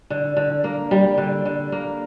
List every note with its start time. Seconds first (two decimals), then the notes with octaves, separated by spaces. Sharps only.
0.10 D3
0.37 D3
0.64 A#3
0.91 G3
1.18 D3
1.45 D3
1.72 A#3